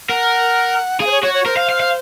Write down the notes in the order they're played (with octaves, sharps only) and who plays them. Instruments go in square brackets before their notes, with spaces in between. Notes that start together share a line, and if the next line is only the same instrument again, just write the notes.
[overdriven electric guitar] A#4 [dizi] F#5
[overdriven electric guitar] G#4 [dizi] F5
[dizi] C5
C#5
[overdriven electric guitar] F#4 [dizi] C#5
[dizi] C#5
[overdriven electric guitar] A#4 [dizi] C5
[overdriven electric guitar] F5
F5
F5